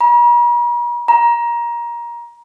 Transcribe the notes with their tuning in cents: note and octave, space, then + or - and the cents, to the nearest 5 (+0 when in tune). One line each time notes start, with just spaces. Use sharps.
A#5 +45
A#5 +20